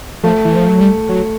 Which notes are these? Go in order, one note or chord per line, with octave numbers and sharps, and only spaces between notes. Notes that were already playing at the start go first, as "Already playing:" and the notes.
F3 A3
E3
F3
F#3
G3
F#3